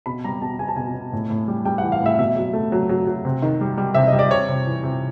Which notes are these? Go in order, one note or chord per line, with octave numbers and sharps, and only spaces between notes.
B2 B5
G3 A#5
B2 A5
B2 G#5
A5
B2 G#5
B2
A2
A2
G3
G3 G5
E3 F#5
F5
A2 E5
B2 E5
F#3
A3
F#3
F#3
F#3
C3
D#3
G3
G3
C3 E5
D#5
G3
D5
C3 C#5
C3
E3
C3